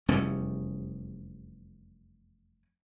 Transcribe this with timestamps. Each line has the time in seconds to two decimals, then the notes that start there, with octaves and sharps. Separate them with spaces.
0.08 F1 E2 G3 C#4